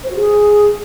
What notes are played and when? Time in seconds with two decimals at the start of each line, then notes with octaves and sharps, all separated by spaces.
0.03 C5
0.09 F#4
0.16 G#4